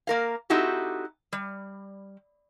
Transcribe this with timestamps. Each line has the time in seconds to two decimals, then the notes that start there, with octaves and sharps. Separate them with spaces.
0.07 A#3 A#4 F5
0.50 C4 D#4 E4 F#4 G4 A4
1.33 G3